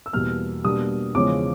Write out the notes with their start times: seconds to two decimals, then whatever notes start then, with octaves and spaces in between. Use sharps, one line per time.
0.06 E6
0.13 E2 B2 G3 A#3 F6
0.64 B2 G3 A#3 D4 D#6
1.15 E2 C#3 F3 G#3 C#4 D6